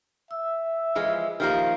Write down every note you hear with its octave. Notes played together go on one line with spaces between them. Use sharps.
E5 E6
E3 F3 G#3
D#3 F3 A#3 G4